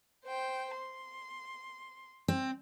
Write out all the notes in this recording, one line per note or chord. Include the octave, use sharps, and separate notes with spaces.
C5 G5
C6
C4